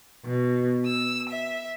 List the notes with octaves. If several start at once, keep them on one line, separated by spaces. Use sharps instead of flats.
B2
E6
E5